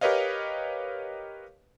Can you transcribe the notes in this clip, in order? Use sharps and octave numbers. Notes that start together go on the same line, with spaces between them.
G4 A#4 B4 C#5 D#5 F5